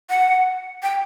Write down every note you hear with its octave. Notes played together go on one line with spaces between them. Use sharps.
F#5
G5